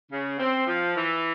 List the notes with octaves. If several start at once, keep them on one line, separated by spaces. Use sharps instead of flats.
C#3
C4
F3
E3